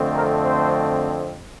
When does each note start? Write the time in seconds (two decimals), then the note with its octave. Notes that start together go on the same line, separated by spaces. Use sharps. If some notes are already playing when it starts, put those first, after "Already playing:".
Already playing: F2 D3 A3 C4
0.14 A#4
0.43 C5